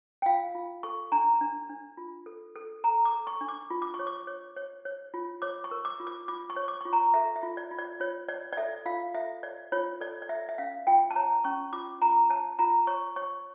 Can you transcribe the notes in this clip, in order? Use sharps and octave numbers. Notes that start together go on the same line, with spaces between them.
G5
F4 F5
F4
A4 C#6
D4 A#5
D4
D4
F4
A4
A4
A4 A#5
D6
A4
C#6
D4
D6
F4
D6
C#6
C#5
D6
C#5
C#5
C#5
F4
C#5 D6
C#6
A#4
D6
F4
D6
F4 D6
C#6
C#5
D6
F4 C#6
A#5
A4 E5
E5
F4
D5
F4
D5
F4 C#5
C#5 D5
D5
A4 E5
F4 F5
A4 E5
C#5 D5
F4 C#5
A4 D5
D5
A4 E5
E5
C#4 F5
F4 G5
A5
C#5 A#5
C#4 C#6
F4 D6
F4 A#5
C#5 A5
F4 A#5
C#5 C#6
C#5 C#6